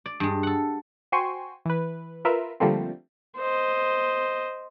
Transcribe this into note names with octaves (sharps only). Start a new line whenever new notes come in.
D5
G2 G#3
A4 F#5
F#4 C5 G5 G#5 C6 C#6
E3 B4
F4 A#4 B4 E5
D3 F3 G3 A3 A#3 C4
C5 D#5